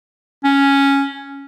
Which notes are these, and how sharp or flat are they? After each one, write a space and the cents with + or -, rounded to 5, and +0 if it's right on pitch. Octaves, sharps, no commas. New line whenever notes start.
C#4 +0